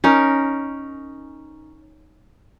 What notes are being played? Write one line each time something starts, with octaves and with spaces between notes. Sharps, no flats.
C#4 D#4 A#4